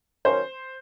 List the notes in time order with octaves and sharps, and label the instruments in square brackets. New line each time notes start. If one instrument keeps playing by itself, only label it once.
[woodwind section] D#3 F#3 A#3 C#4 [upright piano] C5